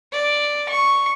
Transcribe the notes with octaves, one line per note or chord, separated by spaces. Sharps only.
D5
C#6